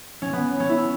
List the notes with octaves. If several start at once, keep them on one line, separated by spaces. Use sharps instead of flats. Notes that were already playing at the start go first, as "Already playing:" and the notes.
C#4
B3
C#4
E4